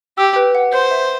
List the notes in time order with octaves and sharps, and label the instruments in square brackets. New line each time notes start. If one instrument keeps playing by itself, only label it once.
[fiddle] G4 [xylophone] E6
[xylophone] B4
F#5
[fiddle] C5 [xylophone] G6
[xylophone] E5